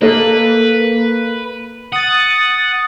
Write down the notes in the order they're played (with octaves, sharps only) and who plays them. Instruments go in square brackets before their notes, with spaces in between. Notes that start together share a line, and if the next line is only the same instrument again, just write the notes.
[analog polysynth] A#3 [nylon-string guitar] A4 D#5 [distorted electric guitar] B4
[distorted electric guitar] F#5 [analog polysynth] D#6 A6